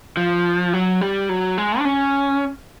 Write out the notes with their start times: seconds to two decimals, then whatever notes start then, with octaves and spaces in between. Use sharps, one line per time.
0.17 F3
0.74 F#3
1.01 G3
1.29 F#3
1.58 G#3
1.79 D4
1.85 C#4